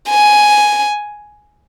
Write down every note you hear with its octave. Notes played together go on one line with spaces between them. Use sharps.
G#5